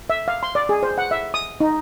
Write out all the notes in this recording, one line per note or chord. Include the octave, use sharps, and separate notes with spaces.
E5
F5
C6
D5
G#4
C5
F#5
E5
D#6
D#4